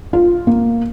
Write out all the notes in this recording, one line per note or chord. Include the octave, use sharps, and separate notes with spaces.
F4
A#3